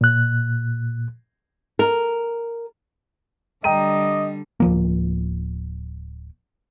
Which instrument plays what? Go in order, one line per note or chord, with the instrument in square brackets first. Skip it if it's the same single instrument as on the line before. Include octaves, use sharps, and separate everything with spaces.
[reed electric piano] A#2 F#6
[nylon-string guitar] A#4
[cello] D3 G3 [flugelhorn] D#5 [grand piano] G5 A#5 D#7
[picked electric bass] D1 F3 A#3